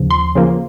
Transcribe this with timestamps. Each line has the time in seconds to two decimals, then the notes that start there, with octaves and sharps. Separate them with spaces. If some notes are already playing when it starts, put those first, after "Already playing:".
Already playing: D#2 C#3 F3
0.11 C6
0.35 C#3 F3 A#3